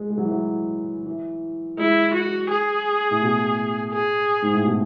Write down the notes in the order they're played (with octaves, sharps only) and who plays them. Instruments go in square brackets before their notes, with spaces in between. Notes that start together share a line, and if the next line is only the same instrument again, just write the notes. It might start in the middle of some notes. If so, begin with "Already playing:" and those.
Already playing: [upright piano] G#3
G#3
F#3
E3
F#3
E3
[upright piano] G#3 [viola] E4
[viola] F#4
G#4
[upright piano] A2
B2
[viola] G#4
[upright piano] G#2
A2
B2